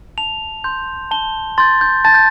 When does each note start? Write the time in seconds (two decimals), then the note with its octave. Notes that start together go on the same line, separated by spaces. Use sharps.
0.18 A5 F7
0.64 C6 G6
1.11 A5 G7
1.58 C6 G6 A6
1.81 G6
2.05 A5 A6
2.14 G6